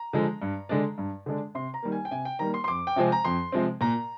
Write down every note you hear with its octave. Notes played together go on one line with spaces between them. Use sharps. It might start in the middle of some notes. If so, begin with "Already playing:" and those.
Already playing: A#5
D3 F3 G#3
G2
D3 G#3 D4
G2
D3 G#3 D4
C3 C6
A#5
D#3 G3 A#3
G#5
G5
C3 G#5
G5
D#3 G3 A#3 A#5
C6
C6
F2 D6
G5
C3 F3 G#3 C4 G#5
A#5
F2 C6
C3 F3 G#3 C4
A#2 A#5